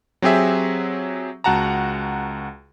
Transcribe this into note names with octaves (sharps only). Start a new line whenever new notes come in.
F#3 C4 G4 G#4 E5
C#2 F#4 F#5 A5 A#5